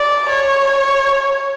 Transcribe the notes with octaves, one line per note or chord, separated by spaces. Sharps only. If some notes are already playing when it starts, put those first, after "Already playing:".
Already playing: D5
C#5